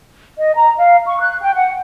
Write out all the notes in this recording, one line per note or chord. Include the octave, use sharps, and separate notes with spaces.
D#5
A#5
F5
C#6
F#6
G5
F#5